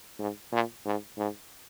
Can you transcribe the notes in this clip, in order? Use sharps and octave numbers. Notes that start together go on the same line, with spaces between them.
G#2
A#2
G#2
G#2